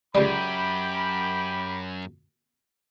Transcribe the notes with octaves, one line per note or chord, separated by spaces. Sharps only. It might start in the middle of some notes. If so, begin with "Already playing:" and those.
C#2 F#2 G3 G4 G5 B5